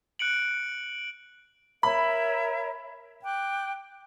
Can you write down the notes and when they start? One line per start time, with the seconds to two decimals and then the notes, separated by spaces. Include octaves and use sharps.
0.19 F#6 C#7 D7 F#7
1.83 A#4 C#5 E5 B5
3.24 G5 D6 F#6